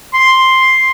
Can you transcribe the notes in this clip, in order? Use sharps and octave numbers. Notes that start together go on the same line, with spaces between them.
C6